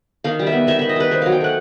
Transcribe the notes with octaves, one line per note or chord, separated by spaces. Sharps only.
D#3 F5
G3
E5
B3
D#3 E5
D#3 E5
D#5
G3 B4
D#3 C5
F#3 F5
G5
A3 F#5